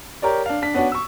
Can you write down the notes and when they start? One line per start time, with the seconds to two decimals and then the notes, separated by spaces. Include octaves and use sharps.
0.22 G4 A#4 C#5 D5
0.46 D4 F5
0.62 D4 B6
0.74 B3 C#4 D4 F#4
0.92 C#6 E6